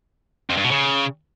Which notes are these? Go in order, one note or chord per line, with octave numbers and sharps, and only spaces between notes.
F2
G2
B2
C#3